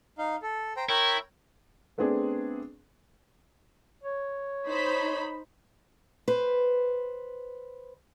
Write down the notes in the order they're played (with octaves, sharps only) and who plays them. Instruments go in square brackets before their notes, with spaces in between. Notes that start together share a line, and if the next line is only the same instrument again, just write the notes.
[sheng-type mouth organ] D#4 F5
A4
C5 G5 A#5
[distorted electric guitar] E4 [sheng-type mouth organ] A#4 C#5 G5
[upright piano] A3 B3 C4 D4 G#4
[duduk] C#5
[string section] D#4 C5 B5
[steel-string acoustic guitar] B4 C5